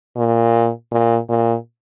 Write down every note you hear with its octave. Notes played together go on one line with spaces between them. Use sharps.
A#2
A#2
A#2